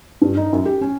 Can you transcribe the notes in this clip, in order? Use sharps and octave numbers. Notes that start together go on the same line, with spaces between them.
G2
D#4
F#2
G4
C#4